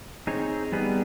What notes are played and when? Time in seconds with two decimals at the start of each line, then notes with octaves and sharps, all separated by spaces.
0.27 C4 D#4 G#4 C#5
0.72 G3 B3 D#4 G#4 B4